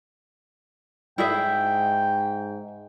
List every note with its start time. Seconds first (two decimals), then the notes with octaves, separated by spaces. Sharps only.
1.18 G#2 E4 G#4 E5 G5